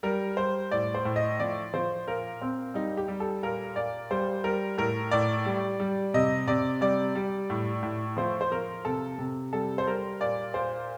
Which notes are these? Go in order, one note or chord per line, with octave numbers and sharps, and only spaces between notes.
G3 A#4
G3 C5
A2 D5
C5
A2
D#5
F3 D5
F3 C5
A#2 A#4
A#2 C4
G3 D#4
G4
G3
A4
A#2 A#4
A#2 D5
G3 C5
G3 A#4
A2 A#4
A2 D5
G3
G3
C3 D#5
C3 D5
G3 D5
G3
A2
A2
F3 C5
C5
F3 A#4
C3 A4
C3
G3 A4
C5
G3 A#4
A#2 D5
A#2 C5